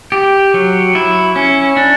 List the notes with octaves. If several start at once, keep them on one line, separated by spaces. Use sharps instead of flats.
G4
F#3
E4
C#4
D4